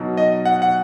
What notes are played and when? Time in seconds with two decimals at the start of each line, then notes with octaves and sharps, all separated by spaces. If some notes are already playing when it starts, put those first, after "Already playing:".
Already playing: B2 F#3 D#4
0.17 D#5
0.45 F#5
0.62 F#5